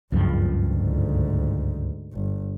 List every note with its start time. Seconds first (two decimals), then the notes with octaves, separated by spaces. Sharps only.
0.12 F#1 C#2 G2 F3
0.63 D2 G#2
2.13 G1